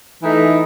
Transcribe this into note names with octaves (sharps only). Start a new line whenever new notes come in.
E3 A3 D#4